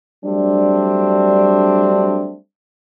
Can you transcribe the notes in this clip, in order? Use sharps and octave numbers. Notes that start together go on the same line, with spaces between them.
F#3 G3 A3 C4 D4